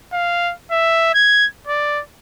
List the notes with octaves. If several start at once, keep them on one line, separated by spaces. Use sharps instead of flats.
F5
E5
G#6
D5